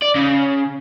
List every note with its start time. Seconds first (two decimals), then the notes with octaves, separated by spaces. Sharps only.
0.02 D5
0.15 C#3